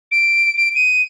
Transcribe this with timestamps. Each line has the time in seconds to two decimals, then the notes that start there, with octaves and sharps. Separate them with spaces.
0.12 D7
0.57 D7
0.75 D#7